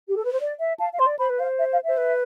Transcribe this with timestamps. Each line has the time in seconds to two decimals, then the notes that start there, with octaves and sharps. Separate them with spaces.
0.08 G4
0.16 A4
0.24 B4
0.32 C5
0.40 D5
0.60 E5
0.80 F5 A5
0.93 F5
0.99 C5 C6
1.06 D5
1.19 C5 B5
1.30 B4
1.39 C5 F5
1.59 E5
1.72 F5
1.85 C5 E5
1.97 B4